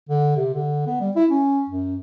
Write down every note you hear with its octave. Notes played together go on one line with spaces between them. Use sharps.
D3
C3
D3
B3
G3
E4
C#4
F#2